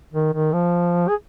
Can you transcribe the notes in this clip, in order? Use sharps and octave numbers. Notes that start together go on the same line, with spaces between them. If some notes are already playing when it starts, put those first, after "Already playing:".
D#3
D#3
F3
G#4